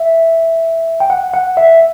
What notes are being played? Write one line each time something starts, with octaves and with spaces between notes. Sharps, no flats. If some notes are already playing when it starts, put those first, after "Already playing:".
Already playing: E5
G5
F#5
F#5
E5